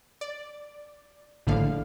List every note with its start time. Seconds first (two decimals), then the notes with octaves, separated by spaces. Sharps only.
0.21 D5
1.47 A#1 A2 D3 F5